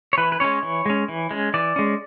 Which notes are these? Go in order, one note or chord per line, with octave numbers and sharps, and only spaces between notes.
C#5
E3 B4
B4
G#3 C#4 C#5
E3
G#3 C#4
E3
G#3 C#4
E3 D5
G#3 C#4